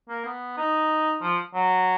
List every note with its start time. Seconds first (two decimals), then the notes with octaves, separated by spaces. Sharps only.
0.09 A#3
0.25 B3
0.57 D#4
1.21 F3
1.54 F#3